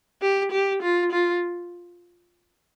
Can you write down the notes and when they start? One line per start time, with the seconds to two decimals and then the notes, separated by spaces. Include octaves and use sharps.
0.22 G4
0.52 G4
0.82 F4
1.12 F4